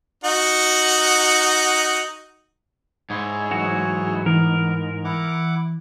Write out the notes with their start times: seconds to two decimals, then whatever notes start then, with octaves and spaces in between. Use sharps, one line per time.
0.24 D#4 F#4 F#5
3.10 G#2 E4 G#4 C#5
3.51 E3 F#3 F#4
4.26 E3 B3 A#4
5.04 E4 F#5 D6